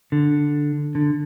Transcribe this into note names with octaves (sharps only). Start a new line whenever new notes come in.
D3
D3